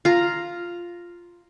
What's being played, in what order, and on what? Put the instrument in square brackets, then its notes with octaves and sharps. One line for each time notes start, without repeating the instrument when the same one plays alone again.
[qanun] F4 A#5